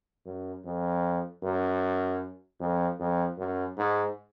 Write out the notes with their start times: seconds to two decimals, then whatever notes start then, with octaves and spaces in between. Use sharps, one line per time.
0.26 F#2
0.65 F2
1.43 F#2
2.60 F2
3.00 F2
3.38 F#2
3.77 G#2